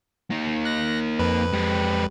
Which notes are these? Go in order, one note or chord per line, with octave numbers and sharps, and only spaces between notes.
A#3 D#4
F#6 A#6
F2 B4
G#3 G4